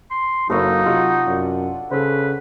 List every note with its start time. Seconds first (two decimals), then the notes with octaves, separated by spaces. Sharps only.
0.11 C6
0.50 F#1 F#3 A#3 D#4 A4 C#5 F5
0.85 C3 F4 D#5 F#5
1.27 F#2 D4
1.91 C#3 A4 B4 C5